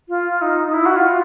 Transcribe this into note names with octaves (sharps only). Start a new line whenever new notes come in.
F4
D#4
D#4
E4
F#4
F4